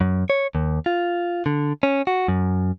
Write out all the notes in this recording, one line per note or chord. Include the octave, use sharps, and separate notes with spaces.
F#2
C#5
D#2
F4
D3
C#4
F#4
F#2